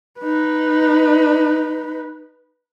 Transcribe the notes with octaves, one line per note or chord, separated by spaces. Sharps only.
D#4 B4